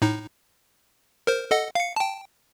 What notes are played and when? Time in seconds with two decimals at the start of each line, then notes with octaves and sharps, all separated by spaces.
0.02 A2 D#4
1.27 A#4 C5
1.51 A4 D#5 F#5
1.75 F5 C#7
1.96 G5 A5